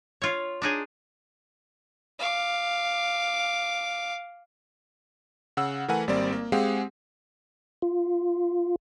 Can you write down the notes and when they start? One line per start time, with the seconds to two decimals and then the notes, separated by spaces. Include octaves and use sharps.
0.22 F4 C#5
0.62 D4 D#4 G#4
2.19 F5 D6
5.57 C#3 F#5 E6
5.88 E3 A3 A#4 B4 F#5 G#5
6.08 G#1 G3 A#3 C4 D5
6.33 A#3
6.52 G#3 C4 G4 G#4 F5 F#5
7.82 F4